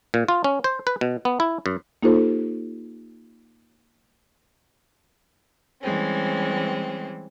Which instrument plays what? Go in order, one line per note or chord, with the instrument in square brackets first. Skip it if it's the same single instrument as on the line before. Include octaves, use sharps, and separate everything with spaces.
[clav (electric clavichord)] A#2
F4
C#4
C5
B4
B2
B3
E4
F#2
[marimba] A#3 D#4 F4 G4 A4 C5
[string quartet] E3 G3 G#3 C4 C#4